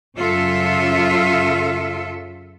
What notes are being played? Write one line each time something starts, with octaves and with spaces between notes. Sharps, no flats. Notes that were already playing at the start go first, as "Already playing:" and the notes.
F#2 C#3 F4 A4 E5